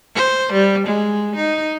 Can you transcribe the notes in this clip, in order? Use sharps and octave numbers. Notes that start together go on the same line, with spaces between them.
C5
G3
G#3
D#4